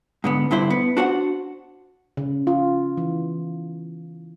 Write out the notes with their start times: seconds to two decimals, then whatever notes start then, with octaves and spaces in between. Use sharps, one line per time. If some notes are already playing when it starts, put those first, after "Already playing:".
0.24 G#2 D3 B3
0.51 G2 D3 E4 C5
0.70 B3
0.97 D4 F#4 C5 F#5
2.17 C#3
2.47 F4
2.97 E3